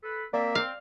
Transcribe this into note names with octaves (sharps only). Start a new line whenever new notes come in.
A4 B4
A#3 C4 D5 E5
C4 F5